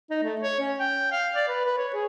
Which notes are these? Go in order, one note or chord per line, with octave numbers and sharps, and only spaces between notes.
D#4
A3
C#5
C#4
G5
F5
D5
B4
B4
C#5
G#4